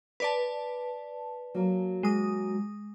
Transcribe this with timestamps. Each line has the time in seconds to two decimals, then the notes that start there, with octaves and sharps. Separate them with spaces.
0.20 B4 D5 A5
1.54 F#3 A#3
2.03 G#3 D#6